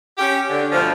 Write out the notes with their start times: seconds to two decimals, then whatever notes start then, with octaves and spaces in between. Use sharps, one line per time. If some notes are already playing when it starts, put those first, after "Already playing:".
0.18 C#4 G4
0.50 D3
0.72 D2 B2 F3